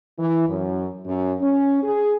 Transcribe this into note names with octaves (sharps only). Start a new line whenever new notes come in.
E3
F#2
F#2
C#4
G#4